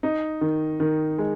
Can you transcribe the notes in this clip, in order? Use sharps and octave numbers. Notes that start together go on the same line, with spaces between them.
D#4
D#3
D#3
G#3